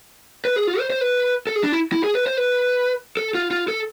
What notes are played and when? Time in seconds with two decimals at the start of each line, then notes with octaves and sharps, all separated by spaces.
0.45 B4
0.56 G#4
0.67 F4
0.79 C5
0.90 C5
1.01 B4
1.47 A4
1.56 G#4
1.64 D4
1.72 E4
1.92 E4
2.04 G#4
2.15 B4
2.27 C5
2.37 B4
3.17 A4
3.35 F4
3.51 F4
3.68 A4